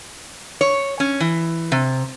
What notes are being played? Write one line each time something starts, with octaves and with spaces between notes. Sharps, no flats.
C#5
C#4
E3
C3